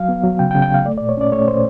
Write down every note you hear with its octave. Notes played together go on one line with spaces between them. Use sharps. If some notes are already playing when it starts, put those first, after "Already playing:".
Already playing: F#3 F5
B3
F#3
C#3 G5
G5
C#3
G5
C#3 F5
A3 D5
D5
A#2
C#5
C#4 D5
A3 C#5
A#2 C5